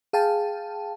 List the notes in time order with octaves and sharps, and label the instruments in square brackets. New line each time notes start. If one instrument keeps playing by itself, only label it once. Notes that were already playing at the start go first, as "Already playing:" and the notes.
[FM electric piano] G#4 F5 G5 A5